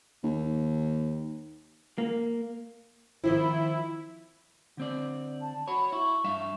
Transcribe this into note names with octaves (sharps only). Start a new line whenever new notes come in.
D#2
A#3
D#3 F3 C4 E4
D3 C4 D5
A5
F#4 C#5 B5
E4 C#6
G2 E5 F5